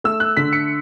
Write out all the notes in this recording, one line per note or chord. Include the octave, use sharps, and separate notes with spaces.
A3 E6
F#6
D3 B6
C#7